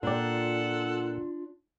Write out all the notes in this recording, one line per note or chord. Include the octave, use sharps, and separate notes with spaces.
A#2 D4 F4 A4 A#4 D5 F#5 G5